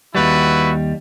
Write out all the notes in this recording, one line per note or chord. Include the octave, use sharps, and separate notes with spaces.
D#2 G3 E4 F#4 B4